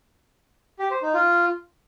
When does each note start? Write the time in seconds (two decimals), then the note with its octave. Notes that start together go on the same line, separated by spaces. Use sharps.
0.79 G4
0.91 C5
1.02 D#4
1.14 F4